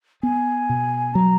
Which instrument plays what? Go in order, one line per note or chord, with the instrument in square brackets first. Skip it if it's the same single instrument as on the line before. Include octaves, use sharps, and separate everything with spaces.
[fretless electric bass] B3 [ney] G#5
[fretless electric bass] B2
[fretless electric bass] F#3 [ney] A#5